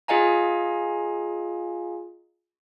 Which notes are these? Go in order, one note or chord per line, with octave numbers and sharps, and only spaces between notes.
F4 G#4 D#5 F5 G#5 A#5